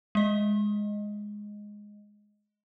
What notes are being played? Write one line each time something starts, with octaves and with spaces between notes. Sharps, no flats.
G#3 D#5